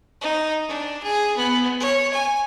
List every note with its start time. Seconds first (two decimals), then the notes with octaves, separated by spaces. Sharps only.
0.21 D#4
0.68 D4
1.03 G#4
1.37 B3
1.80 C#5
2.13 G#5